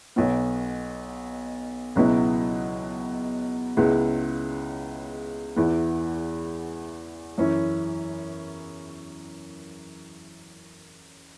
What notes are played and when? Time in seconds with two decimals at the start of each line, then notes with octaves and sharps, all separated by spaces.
0.16 B1 B2 B3
1.96 C#2 B2 F#3 B3 E4
3.77 C#2 C#3 G#3 B3 E4
5.56 E2 E3 B3 E4
7.38 F#2 E3 C#4 E4